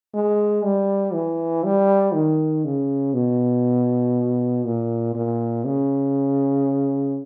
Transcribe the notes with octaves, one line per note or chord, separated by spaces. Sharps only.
G#3
G3
E3
G3
D#3
C#3
B2
A#2
A#2
C#3